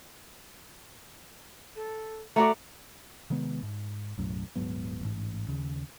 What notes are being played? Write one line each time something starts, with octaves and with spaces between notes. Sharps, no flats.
A4
A3 F#4 D5 A#5
C3 D#3 G#3 B3
G#2
B1 F#2 A2
D#1 G#2 F#3 B3
A1 G#2
D#2 C#3